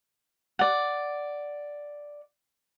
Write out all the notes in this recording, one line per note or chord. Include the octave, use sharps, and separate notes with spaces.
D5 F#5